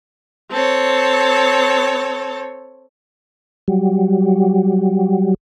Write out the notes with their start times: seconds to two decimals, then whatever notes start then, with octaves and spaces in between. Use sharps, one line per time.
0.50 C4 A4 C#5
3.68 F#3 G3